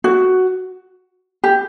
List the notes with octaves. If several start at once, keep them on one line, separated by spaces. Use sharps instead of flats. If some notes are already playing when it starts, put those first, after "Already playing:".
F#4
G4